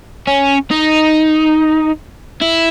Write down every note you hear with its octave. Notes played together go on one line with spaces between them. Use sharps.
C#4
D#4
E4